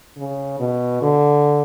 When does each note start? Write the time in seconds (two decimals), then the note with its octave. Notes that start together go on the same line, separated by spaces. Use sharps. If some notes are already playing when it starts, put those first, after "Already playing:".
0.17 C#3
0.59 B2
1.02 D3